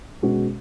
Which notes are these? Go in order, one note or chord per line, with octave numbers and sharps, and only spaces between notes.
B2 G#3 C#4 F#4